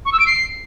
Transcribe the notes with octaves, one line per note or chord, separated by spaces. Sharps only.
C#6
E6
D7
C7